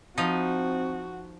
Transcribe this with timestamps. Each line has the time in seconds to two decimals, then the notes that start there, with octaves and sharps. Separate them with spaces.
0.18 F3 C4 D#4 F#4